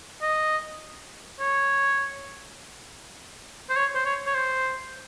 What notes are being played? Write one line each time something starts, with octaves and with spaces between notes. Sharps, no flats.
D#5
C#5
C5
C#5
C5
C#5
C#5
C5